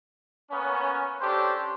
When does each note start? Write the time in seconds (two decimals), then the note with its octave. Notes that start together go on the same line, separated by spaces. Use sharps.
0.51 A#3 B3 C#4
1.21 C#4 D4 G4 A4 C5